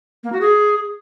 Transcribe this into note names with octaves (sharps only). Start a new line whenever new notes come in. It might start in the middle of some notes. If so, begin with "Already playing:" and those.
A#3
F#4
G#4